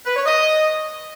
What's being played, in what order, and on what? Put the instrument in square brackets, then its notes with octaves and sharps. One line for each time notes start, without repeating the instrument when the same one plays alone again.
[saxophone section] B4
C#5
D#5